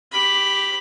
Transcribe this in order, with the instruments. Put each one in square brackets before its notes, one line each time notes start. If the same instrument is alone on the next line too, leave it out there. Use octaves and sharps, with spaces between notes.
[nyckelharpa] G4 B5